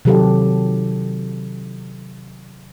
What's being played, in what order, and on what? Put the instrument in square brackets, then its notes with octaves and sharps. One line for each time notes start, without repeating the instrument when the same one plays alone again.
[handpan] C3 D#3 F#3 G4 A4